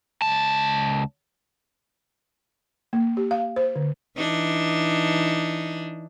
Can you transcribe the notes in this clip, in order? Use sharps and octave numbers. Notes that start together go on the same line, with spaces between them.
C#2 A5
A#3
G4
F5
C5
D3
E3 D4 D#4